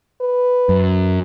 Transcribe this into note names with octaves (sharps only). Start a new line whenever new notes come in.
B4
F#2